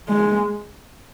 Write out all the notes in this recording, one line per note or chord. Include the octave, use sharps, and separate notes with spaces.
G#3